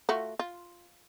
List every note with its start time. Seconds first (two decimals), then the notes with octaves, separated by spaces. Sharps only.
0.09 A3 F4 F#4
0.39 F4